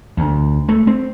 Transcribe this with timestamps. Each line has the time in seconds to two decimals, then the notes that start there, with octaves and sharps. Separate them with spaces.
0.17 D2
0.69 A3
0.87 C4